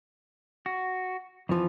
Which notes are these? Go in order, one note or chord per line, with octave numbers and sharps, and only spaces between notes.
F#4
F2 E3 F3